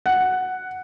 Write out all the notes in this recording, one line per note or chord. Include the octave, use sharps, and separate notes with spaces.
F#5